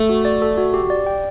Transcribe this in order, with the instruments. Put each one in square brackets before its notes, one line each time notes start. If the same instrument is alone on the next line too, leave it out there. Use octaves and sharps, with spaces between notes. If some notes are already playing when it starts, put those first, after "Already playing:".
Already playing: [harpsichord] A3
[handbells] F#4
D5
A4
F#4
G4
D5
G5